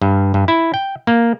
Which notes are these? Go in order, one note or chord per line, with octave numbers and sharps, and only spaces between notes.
G2
G2
E4
G5
A#3